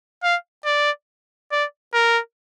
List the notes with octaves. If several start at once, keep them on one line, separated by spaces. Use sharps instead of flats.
F5
D5
D5
A#4